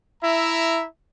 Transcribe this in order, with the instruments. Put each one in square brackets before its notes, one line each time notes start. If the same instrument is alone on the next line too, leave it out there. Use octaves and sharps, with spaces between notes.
[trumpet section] E4 E5 A#5